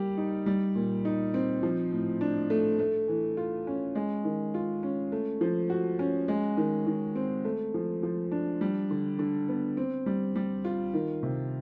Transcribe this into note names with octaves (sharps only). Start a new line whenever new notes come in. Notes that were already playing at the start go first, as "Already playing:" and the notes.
Already playing: G3 A#3 G4
D#4
G3
A#2
D#4
C4
F3
A2
D4
A3
A3
E3
F4
C#4
G#3
D#3
F4
C#4
A3
F3
F#4
C#4
G#3
D#3
D#3
C4
A3
F3
F3
D4
G3
D3
D3
B3
C4
G3
G3
F4
D#3
C3